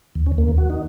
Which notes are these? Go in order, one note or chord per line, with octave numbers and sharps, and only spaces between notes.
D#2
C#4
D#2
A#3
D#2
F#4
D#4